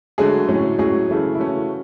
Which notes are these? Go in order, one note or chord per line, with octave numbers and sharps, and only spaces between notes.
D3 F#3 G#3 A3 G#4
A2 F#3 C#4
A2 F#3 G#3 C#4 G#4
C#3 E3 A3 C#4
E4
C#3 E3 A3 C#4 F#4